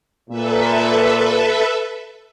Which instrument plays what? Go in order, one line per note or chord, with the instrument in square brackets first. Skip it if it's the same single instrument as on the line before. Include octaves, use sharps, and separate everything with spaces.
[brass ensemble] A#2 [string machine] A4 B4 E5